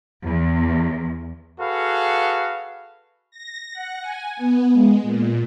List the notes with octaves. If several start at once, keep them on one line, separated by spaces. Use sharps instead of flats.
E2
F#4 G#4 A4 B4 F5
A#6
F#5
G#5
B3
G#3
A#2